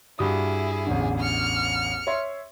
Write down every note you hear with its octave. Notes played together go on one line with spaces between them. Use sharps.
G2 E4 F#4 G#4 D#6
A1 E2 D3
F6 C#7
C#5 E5 C6